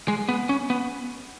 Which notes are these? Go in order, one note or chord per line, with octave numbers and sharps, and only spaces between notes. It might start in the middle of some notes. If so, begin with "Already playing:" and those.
G#3
B3
C#4
B3